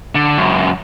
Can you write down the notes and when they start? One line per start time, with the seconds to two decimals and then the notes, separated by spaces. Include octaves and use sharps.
0.15 D3
0.37 C#2 F#2